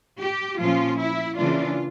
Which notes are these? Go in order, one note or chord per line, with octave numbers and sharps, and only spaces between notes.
G4
A#2 F3 C#4 F4
E4
C#3 E3 A#3 D4 F4